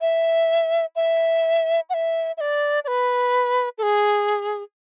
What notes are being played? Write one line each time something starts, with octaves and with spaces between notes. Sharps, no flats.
E5
E5
F#5
E5
E5
D5
D5
B4
A4
G#4